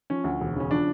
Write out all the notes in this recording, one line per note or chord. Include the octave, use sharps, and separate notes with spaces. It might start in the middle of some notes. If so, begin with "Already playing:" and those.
F3 C#4
D2
E1
C#3 C#4
F3 D4